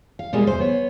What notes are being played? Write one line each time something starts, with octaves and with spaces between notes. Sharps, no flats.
F5
B2 G3 G#3 A#3 B3
E2 C5
B3 C#5